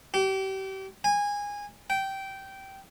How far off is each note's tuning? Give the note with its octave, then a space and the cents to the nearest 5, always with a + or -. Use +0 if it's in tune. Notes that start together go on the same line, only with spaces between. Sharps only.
G4 -35
G#5 -20
G5 -15